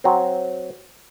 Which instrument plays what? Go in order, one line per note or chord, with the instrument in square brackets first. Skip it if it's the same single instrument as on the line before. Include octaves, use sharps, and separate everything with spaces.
[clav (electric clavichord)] F#3 C4